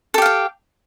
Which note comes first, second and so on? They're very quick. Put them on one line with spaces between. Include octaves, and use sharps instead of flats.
A4 G4 F5 G5